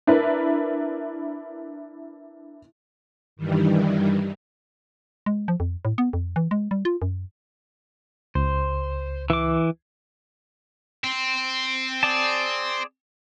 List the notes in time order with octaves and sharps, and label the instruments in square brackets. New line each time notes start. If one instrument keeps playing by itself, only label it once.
[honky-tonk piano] D4 E4 A#4 B4
[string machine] G2 D#3 E3 G3
[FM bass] G#3
F3
F2
A2
B3
F2
E3
G#3
G3
F4
F#2
[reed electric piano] C#2 [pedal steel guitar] C5
[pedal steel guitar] E3 D6
[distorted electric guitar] C4
[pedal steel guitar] G#4 D5 A5